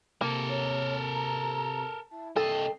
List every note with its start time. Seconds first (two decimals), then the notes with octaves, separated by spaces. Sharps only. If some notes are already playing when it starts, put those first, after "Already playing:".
0.21 C3 A#3 A4 A#4
0.49 C#5
1.15 A#5
2.11 E4 A5
2.36 C2 A4 D#5 G5 C7